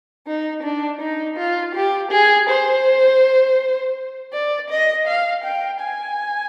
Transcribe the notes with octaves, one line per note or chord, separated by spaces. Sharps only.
D#4
D4
D#4
F4
G4
G#4
C5
D5
D#5
F5
G5
G#5